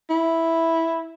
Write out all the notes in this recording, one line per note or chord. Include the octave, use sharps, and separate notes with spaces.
E4